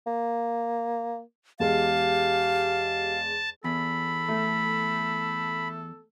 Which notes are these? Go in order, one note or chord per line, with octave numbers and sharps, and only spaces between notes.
A#3
E2 G#3 G4 F5 A5
E2 A4 B5
A3